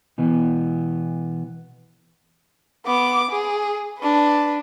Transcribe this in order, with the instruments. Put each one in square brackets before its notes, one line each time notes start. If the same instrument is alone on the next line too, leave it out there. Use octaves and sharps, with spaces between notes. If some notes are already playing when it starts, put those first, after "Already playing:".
[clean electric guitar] B2 E3 B3
[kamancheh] B3 D6
G#4
D4 B4